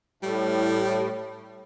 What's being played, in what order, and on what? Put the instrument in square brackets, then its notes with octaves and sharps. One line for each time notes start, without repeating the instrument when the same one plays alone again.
[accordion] A2 [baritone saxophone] G3